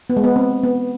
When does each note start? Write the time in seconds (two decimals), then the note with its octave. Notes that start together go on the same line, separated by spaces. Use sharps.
0.10 B3
0.17 G#3
0.24 B3
0.36 C4
0.63 B3